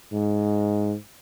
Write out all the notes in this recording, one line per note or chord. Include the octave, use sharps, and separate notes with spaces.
G#2